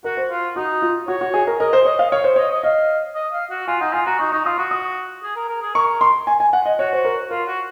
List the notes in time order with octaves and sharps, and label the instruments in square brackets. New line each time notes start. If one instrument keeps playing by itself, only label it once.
[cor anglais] F#4 [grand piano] A#4
[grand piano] C5
[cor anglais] F4
[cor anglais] D#4 [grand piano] F#4
[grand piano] F4
[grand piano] F#4 [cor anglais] C#5
[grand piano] F#4
G#4
A#4
[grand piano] A#4 [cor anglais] D#5
[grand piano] C5
[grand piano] C#5 [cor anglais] D#5
[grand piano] F5
[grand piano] C#5 [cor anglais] F5
[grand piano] C5
[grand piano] C#5 [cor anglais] D#5
[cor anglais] D#5
[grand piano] D#5 [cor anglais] F5
[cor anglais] D#5
F5
F#4
[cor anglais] F4 [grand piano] G#5
[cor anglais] D#4 [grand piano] F#5
[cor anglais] F4 [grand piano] G#5
[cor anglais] F#4 [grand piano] A#5
[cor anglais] D#4 [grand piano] C#6
[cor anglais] D#4 [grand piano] C#6
[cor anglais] F4 [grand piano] D#6
[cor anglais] F#4 [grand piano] C#6
[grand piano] D#6
[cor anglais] G#4
A#4
A#4
G#4
[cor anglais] A#4 [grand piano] C#6
[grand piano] C6
G#5
G#5
F#5
D#5
[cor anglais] F#4 [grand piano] C#5
[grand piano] C5
A#4
[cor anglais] F4 [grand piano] A#4
[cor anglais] F#4